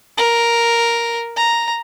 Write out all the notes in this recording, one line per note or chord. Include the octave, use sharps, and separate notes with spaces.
A#4
A#5